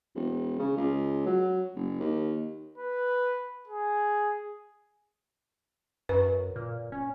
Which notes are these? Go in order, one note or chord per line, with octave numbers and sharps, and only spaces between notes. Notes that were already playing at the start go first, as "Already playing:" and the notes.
E1
C#3
C#2
F#3
F#1
D#2
B4
G#4
F#2 B4
A#2
C#4